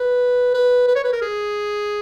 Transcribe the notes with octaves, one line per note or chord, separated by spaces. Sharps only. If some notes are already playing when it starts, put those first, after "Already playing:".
Already playing: B4
B4
B4
C#5
B4
A#4
G#4